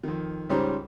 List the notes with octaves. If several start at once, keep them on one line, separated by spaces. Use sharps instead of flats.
F2 D#3
C#2 G#2 G3 C#4 C5 A#5